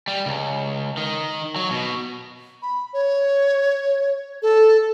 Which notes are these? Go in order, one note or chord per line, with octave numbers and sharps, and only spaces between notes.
G3
C#2
D#3
F#3
B2
B5
C#5
A4